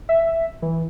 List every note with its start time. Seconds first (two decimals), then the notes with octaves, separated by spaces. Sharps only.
0.09 E5
0.62 E3